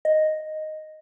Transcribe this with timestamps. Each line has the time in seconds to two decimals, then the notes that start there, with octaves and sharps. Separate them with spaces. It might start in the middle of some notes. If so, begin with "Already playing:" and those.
0.05 D#5